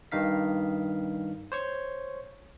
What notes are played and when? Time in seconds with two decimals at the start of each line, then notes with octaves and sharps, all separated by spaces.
0.12 G2 D#3 D#4 F5 B6
1.52 C5 C#5 C#6